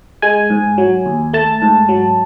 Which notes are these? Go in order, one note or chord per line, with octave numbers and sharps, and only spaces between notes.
G#3 G#5
G#2
F#3
D#2
A3 A5
G#2
F#3